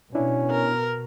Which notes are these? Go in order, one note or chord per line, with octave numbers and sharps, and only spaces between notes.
B2 C#4 D4 E4
A#4